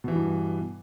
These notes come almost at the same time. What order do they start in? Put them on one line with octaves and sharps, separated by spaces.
B2 E3 G3 G2